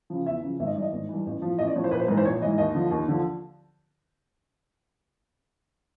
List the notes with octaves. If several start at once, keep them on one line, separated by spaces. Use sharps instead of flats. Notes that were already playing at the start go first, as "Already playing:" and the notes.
C#3 F3
E2 E5
C#3 F3
G#1 E5
D#5
G2 E3 D5
D#5
G#1
G2 E3
A1
A2 F3
A1 D#5
D5
A2 F3 C#5
C5
A#1 B4
C5
G#2 E3 B4
C5
A#1 C#5
G#2 E3 D#5
D#2 D#5
D3 F3
D#2
D3 F3